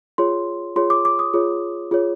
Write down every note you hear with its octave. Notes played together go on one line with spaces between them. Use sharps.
F4 G#4 C#5 C6
F4 G#4 C#5 C6
D6
D6
D#6
F4 G#4 C#5
F4 G#4 C#5